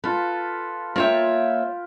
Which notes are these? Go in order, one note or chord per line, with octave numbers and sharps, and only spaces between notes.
F4 A4 B4
A#3 F4 C#5 E5 G5